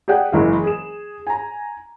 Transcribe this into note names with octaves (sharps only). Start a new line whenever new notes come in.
G4 G#4 D5 F#5 G5
F#1 E3 G#3 F5
G#4 E7
G#5 A#5